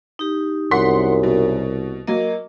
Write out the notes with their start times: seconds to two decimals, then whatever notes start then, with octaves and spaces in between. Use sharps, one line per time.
0.19 D#4 G4
0.71 C2 F#2 F#5 C6 B6
1.23 B2
2.07 F#3 A#3 A#4 D#5